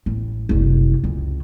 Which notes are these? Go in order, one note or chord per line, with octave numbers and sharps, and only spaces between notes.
A1
F#1 C2
C#2